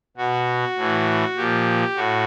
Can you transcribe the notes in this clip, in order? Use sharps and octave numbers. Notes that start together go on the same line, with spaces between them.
B2 F#4
A2 E3
A#2 F3 G4
A2 F#4